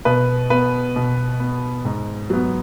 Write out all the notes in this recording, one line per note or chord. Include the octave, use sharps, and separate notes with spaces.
B2 B4
B3 B4
B2
B3
G#2
F#3 B3